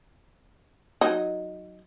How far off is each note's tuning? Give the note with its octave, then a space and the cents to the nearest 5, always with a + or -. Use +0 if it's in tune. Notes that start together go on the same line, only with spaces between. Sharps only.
F#3 -5 D#4 +0